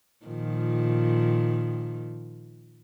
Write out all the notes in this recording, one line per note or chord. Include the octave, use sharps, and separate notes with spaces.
A#2 D#3 F3